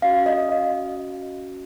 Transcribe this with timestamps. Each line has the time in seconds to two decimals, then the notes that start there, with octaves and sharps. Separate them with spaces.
0.02 C#4 F#4 F5
0.26 D#5
0.49 D#5